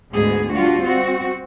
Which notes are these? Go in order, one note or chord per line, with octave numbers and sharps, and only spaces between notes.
D2 G#2 G#3 B3 G#4
G3 D4 F4 F#4
C4 F#4